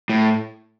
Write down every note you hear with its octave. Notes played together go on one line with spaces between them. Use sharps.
A2